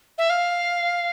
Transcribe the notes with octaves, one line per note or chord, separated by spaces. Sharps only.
E5
F5